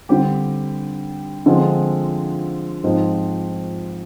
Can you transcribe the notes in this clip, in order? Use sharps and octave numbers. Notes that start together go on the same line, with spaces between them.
D3 G3 C4 G4
D3 F3 G#3 C4 F4
G#2 F3 C4 D#4